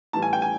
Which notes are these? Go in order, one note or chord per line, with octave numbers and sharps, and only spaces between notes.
A2 E3 G3 A5
G#5
G5
G#5